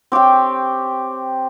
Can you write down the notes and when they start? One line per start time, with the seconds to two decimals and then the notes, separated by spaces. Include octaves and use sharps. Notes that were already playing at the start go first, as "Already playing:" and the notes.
0.12 C4 G4 C#5 G5